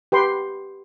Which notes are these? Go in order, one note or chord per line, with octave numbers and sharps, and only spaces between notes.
G4 B4 G5 C6